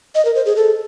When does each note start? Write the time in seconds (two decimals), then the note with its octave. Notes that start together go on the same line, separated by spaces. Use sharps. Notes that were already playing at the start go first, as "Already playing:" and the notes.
0.15 D#5
0.25 A#4
0.35 C5
0.46 G#4
0.56 A4